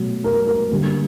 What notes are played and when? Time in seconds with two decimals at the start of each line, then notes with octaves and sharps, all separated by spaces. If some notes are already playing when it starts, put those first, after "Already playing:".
Already playing: B2 F#3 A3
0.24 A#4
0.47 A#4
0.71 D3 G3 A#3